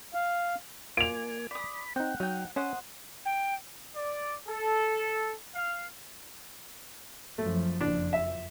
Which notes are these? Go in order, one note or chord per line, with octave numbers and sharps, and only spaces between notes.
F5
A#3 F4 D5 G#5 D7 F7
D5 B5 D#6
C4 D#4 F#5 G5
F#3 D#4 G5
C#4 C5 D#5 F#5
G5
D5
A4
F5
F#2 F3 A3
F#1 F2 F3 D4
E5